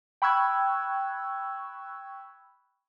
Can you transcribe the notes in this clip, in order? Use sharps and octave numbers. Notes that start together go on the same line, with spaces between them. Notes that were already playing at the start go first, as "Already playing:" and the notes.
G5 B5 C#6 E6 F#6 G#6